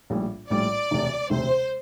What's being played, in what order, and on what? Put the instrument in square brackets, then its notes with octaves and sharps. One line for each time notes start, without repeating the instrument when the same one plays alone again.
[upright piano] A#1 A2 G3
[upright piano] A#1 A2 G3 [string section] D5
[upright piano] E1 D2 C3
[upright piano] E1 D2 C3 [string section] C5